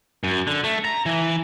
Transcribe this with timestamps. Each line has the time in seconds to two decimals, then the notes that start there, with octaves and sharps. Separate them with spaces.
0.24 F#2
0.47 D3
0.64 A3
0.85 A#5
1.06 E3